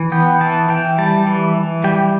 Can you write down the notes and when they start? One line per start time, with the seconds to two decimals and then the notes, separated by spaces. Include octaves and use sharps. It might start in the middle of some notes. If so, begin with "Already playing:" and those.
Already playing: E3
0.12 B3 G5
0.40 E3 A5
0.69 E3 G5
0.98 G3 A5
1.26 E3
1.56 E3
1.84 G3 G5